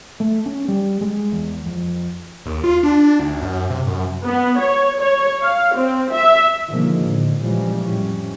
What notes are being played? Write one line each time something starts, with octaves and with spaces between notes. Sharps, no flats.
A3
C#4
G3
G#3
E2
F2
D#2
F4
D4
D4
D2
F#2
C3
F#2
B3
C#5
C#5
F5
C4
E5
B2 D3 D#3 F3 G#3 A#3
A2 D3
A#2 C#3 E3 F3 G3 G#3
F2 A2 E3 G3 C#4